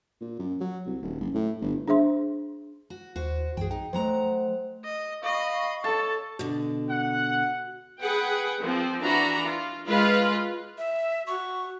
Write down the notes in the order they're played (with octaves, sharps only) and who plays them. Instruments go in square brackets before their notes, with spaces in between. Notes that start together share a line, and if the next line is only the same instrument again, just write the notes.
[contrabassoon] A#2
F#2
F#3
C2
D#1
F#1
A2
G1
[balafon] D4 G#4 C5 E5 C6
[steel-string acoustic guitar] F#4
[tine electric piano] D#2 [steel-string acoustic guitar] F#4 C5
[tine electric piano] B1 F#2 E3 [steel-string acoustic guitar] G#4 G5
[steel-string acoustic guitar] D#4 [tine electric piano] G5
[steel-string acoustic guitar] F#3 F#5 A#5 [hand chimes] A3 C5
[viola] D#5
[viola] D#5 B5 [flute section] F5 C#6
[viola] A4 [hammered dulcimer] C#5 A5
[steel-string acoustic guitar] B2 D3 [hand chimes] F#4
[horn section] F#5
[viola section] G#4 B4 F#5 G5
F3 C4
E3 D4 F#4 A#5 B5
F4
G#3 F4 B4 F5
[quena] E5
[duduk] F#4 [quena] C#6